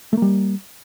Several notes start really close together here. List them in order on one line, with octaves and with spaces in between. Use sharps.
A3 A#3 G3